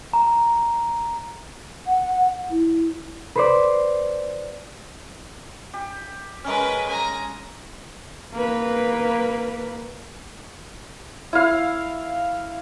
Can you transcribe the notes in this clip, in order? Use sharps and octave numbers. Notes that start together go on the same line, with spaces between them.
A#5
F#5
E4
B4 C5 D5
G4
G#3 C#4 A#4 B4
G#5 A#5
A#3 B4
E4 F5